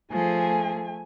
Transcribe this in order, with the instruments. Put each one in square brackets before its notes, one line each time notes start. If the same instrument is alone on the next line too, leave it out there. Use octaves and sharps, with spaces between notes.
[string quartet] F3 G#4 [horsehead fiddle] A3 G#5